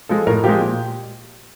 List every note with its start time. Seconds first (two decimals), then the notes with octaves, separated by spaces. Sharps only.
0.09 F3 G#3 A4
0.27 A2 A#4
0.44 F3 G#3 G4
0.61 A#2